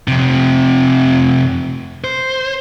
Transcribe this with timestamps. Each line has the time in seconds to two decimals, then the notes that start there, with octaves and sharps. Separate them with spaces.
0.08 F2 C3
2.04 C5